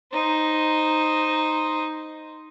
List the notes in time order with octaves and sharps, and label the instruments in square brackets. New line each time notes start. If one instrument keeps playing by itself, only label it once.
[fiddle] D#4 C5